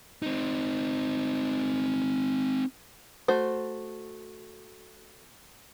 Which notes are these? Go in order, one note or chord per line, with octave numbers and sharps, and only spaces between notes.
C4 D#4
A3 F#4 C5